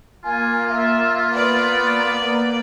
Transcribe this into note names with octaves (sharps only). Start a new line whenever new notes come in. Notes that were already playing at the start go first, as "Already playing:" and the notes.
A#3 F4 G#5
E5
B3 B4 D5